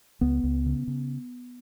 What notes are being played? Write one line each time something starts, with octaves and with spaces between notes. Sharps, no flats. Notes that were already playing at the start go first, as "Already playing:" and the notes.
C#2 B3
C#2
C#3
C#3